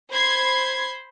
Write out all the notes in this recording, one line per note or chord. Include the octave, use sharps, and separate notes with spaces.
C5 B5 C6 G#6 C7